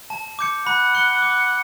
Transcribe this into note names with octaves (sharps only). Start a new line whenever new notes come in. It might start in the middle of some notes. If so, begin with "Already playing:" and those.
A5
D6 G6 C#7
F#5 B5
F#6 C#7 G7
D6